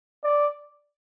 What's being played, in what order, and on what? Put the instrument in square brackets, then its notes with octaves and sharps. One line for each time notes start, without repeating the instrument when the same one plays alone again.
[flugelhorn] D5